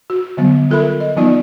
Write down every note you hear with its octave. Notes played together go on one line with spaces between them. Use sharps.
F#4
D3 F#3 G3 B3
F4 A4 A#4 E5 B5
D#5
F3 G3 B3 D#4 F4 D5